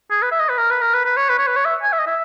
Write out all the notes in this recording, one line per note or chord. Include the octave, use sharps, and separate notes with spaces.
G#4
B4
E5
D#5
B4
A#4
B4
A#4
B4
B4
C#5
B4
C#5
B4
C#5
E5
G#5
E5
D#5
E5